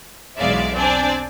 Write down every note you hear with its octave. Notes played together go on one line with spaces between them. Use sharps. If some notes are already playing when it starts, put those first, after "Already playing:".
B1 E2 G#3 D5 E5 F5
C4 D4 D5 G#5